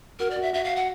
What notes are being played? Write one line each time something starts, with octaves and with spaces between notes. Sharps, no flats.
F#4 A#4
D5
F#4
E5
F#4 E5
F5
F#5